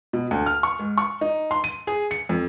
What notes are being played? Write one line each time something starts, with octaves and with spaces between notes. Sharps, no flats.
B2
D2
F6
C#6
G#2
C#6
D#4
C6
D#7
G#4
C#7
F2